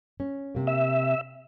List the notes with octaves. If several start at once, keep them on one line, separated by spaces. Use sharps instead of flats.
C#4
C3 A#3
E5